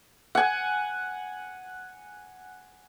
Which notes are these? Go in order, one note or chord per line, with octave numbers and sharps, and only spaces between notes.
F#5 G#5